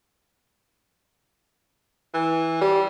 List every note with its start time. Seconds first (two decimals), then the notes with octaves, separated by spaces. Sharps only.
2.14 E3
2.61 G3